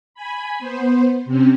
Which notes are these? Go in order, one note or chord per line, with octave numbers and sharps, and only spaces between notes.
G#5 B5
B3 C5
C3 C4 C#4